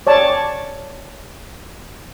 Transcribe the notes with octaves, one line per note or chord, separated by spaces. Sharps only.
C#5 D5 A5